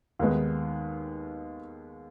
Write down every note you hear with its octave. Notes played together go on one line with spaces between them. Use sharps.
D#2 D#3 G#3 B3